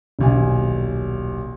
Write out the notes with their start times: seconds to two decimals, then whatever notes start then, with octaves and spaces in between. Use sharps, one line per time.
0.19 D#1 B1 G#5